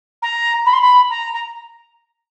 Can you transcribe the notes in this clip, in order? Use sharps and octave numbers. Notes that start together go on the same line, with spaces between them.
A#5
B5
C6
B5
A#5
A#5